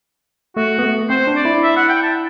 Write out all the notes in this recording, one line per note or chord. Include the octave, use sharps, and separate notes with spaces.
A3 F#4
B3
A3
C4 C5
D4
D5
E4
E5
F#5
G5
A5